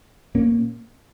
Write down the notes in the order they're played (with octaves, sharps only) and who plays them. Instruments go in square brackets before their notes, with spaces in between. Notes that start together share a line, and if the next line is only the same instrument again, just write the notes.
[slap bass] A#2 A#3 C#4